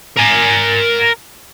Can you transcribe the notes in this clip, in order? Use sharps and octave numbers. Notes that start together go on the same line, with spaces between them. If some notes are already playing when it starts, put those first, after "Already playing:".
A#4 G#5